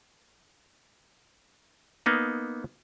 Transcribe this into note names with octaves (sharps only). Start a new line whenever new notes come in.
A#3 B3 D#4